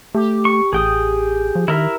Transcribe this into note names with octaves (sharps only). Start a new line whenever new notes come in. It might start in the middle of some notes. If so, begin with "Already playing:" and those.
A3 G4
C#6
A1 G#4 G5 D#6
F3
D#3 E4 A#4 E5